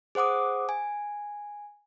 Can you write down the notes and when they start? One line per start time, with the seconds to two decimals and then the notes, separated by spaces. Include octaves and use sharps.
0.15 G#4 C5 F#5 D6 D#6
0.69 G#5